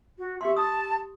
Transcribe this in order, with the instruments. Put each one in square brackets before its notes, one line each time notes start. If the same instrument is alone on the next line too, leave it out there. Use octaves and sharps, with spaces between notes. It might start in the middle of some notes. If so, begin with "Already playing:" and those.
[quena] F#4
[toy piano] G4 C6 [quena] E5
[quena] A5 [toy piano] D#6